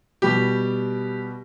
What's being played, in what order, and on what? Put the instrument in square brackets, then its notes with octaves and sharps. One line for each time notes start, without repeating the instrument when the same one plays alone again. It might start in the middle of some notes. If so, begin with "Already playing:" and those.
[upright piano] B2 G3 G4